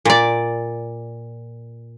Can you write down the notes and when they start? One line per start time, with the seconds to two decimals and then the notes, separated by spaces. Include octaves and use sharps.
0.05 A#2 D5